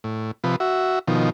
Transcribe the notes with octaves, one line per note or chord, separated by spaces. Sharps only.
A2
C3 F3 B4
F#4 E5
B2 D#3 F3